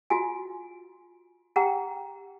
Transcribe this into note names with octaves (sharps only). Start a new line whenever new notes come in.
F4 F#4 G#5
G4 F#5 G5 A#5